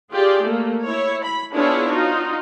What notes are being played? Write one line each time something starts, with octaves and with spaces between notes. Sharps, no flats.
F4 G4 G#4 D5
A3 A#3
E4 C#5
B5
B3 D4 E4 F4 G#4 C#5
D#4 F4 F#4